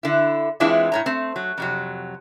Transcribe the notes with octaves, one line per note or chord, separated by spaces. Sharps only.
D3 E4
E3 G#3 C4 D4 E4 F4
A2 C#5 A#5
A3 C4
F#3
F2 C3 F#3